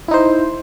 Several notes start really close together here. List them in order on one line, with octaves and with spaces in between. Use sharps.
E4 D#4 C5